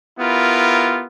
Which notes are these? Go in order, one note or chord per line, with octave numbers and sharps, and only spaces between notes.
B3 E4 F4 G4 A#4